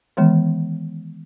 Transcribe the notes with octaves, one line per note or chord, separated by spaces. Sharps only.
D#3 E3 G#3 B3